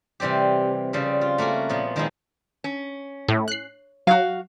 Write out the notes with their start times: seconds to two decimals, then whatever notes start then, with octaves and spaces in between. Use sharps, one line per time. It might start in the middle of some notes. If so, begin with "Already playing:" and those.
0.20 C3 E3 G3 C4 G4
0.93 C#3 F3 G3 C4
1.21 F4
1.38 A3 A#3 C#4 F#4
1.69 A#2 F3 B3
1.96 D#3 F3 G#3 D#4 E4
2.64 C#4
3.28 A2
3.48 F#6 C7
4.07 F#3 F#4 F5